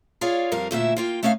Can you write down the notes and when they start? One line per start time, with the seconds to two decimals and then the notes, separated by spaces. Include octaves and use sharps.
0.21 F4 G#4 C#5 D5 F5
0.52 F2 G3 A#4 F5
0.71 D2 A#2 E4 E5
0.96 A#3 F4 G5
1.23 A3 C#4 D#4 D#5 F5